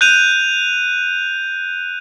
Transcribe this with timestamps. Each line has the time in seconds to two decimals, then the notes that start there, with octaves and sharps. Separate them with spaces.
0.01 F#6 G6 D#7 F7